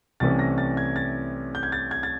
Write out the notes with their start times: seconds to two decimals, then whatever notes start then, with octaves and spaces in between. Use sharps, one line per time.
0.20 C2 C3 E3 A3 C#4 A6
0.39 A#6
0.58 A6
0.77 G#6
0.96 A6
1.55 G6
1.63 G#6
1.72 A6
1.91 G#6
2.03 A6